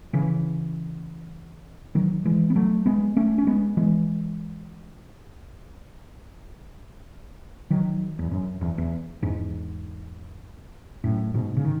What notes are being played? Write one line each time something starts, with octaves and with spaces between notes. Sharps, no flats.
C#3 E3
D#3 F#3
E3 G#3
B3
F#3 A3
G#3 B3
A3 C#4
C#4
G#3 B3
E3 G#3
D#3 F#3
E2
F#2
E2
E2
E2 G#2
F#2 A2
G#2 B2
C#3
D#3